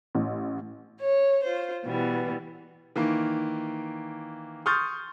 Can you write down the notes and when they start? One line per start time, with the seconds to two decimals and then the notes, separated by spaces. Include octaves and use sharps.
0.15 A1
1.00 C#5
1.43 F4 C5
1.84 B2 E3 G3 B3
2.96 D#3 E3 A#3
4.66 C6 C#6 D#6 F6 G6 A6